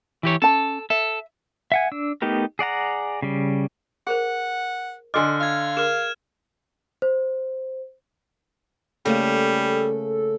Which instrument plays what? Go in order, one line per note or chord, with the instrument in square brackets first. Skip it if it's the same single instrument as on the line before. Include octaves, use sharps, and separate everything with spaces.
[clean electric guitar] E3 G4 C#5
[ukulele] C#4 A5 [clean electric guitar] A4
[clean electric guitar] A4 [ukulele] E5
[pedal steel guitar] E5 F#5 G#5
D4 E6
A3 B3 D#4 G4 A#4
G#4 D5 F#5 A#5
C#3 G3
[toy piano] G#4 A#4 C5 [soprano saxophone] F#5
[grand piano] D3 C6 D6 [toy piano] D#5 F#5 G#5 [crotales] F6
[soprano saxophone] F5 [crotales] F6 G#6
[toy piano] G#4 A#4 [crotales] F6 E7
[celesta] C5
[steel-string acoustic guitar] C#3 A3 A#3 [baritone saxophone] G3 [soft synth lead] A4